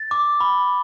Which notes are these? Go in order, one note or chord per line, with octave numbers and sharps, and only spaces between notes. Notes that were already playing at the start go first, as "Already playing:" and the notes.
Already playing: A6
D6
B5